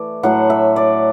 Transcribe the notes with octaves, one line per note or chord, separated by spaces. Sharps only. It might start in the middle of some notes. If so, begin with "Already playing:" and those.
Already playing: E3 A3 D5
A2 F#3 A3 F#5
E5
D5